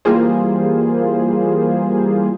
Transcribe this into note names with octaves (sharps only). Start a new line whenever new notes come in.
E3 G3 A#3 F4 G#4 C5